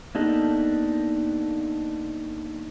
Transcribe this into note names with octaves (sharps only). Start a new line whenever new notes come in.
A#3 B3 D4 D#4 G4 A4